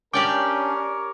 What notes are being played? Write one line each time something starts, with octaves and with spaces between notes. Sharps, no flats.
C#4 D4 G4 A#4 C#5 D5 G5 D6